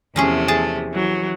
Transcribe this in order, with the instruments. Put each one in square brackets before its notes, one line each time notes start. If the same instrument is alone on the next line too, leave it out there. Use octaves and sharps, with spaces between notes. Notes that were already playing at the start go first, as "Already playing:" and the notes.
[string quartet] E2 C3 A3 [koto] F3 C#4 G#4
[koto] G#4 A5
[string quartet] E3 F#3